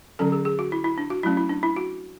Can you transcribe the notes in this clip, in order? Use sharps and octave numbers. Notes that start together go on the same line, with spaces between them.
D3 F#3 C#4 A4
G#4
G#4
F#4
E4
E4
D4
F#4
F#3 A3 C#4 E4
E4
D4
E4
F#4